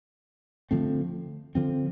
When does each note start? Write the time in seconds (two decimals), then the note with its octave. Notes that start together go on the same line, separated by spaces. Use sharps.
0.71 D3 F3 A3 C4
1.55 D3 F3 C4